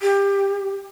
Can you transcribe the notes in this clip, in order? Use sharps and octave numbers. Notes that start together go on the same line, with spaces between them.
G4